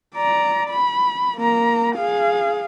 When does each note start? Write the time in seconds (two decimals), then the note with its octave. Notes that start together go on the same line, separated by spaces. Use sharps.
0.15 D5 A#5
0.70 B5
1.37 A#3 A#5
1.96 G#4 F5